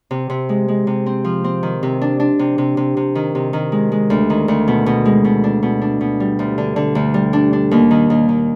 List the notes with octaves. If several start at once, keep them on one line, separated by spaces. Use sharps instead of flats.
C3
C3
G#3
G#3
C3
C4
F3
C4
D#3
C3
D4
D4
C3
C3
C3
C3
D#3
C3
D#3
G#3
G#3
D2
D#3
D2
B2
B2
G#3
B2
D4
B2
D4
B2
G3
D2
D3
D3
D2
G3
D4
D4
D#2
D#3
D#2
D#3